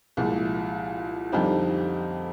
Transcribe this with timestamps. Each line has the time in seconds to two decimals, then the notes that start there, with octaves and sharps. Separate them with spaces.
0.17 C2 A#2 F3 G#3
1.32 F2 D3 G3 C4 D#4